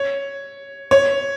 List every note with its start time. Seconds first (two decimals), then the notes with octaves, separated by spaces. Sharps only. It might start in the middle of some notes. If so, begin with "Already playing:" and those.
Already playing: C#5
0.91 C#5